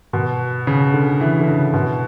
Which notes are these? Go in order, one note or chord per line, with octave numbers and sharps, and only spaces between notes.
B2
C#3
D3
E3
D3
C#3
B2